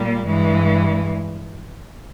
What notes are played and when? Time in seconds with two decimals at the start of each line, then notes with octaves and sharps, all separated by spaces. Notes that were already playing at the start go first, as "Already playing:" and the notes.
Already playing: A#2 G3 A#3
0.26 G2 E3 G#3